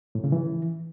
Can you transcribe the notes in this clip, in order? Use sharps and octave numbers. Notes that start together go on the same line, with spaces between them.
A2
C#3
E3